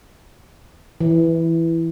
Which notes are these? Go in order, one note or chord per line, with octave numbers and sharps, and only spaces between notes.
E3